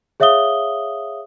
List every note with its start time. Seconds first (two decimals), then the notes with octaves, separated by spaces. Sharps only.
0.20 G#4 C#5 E5 F5 D#6 G7